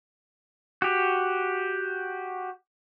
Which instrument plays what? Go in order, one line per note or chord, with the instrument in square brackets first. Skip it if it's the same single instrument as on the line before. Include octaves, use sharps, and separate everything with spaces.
[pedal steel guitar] F#4 G4